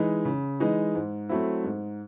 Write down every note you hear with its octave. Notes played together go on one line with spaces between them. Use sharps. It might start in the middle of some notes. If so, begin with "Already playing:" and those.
Already playing: E3 G#3 D#4
C#3
E3 G#3 D#4
G#2
F#3 A3 C4 E4
G#2